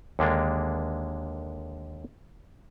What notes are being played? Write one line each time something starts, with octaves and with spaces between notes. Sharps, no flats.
D#2 D3 G#3 A#3 D4